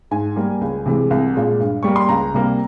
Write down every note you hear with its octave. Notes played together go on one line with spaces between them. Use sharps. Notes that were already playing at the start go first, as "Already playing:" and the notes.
G#2 G#5
G3 A#3
C#2
C3 E3 G#3
C2
A#2 G#3
G2
G3 A#3 C#6
C6
C#2 A#5
C3 G3 A#3